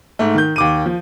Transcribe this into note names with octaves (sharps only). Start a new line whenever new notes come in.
G#2 A3
D#3 G6
D#2 D6 D#7
F3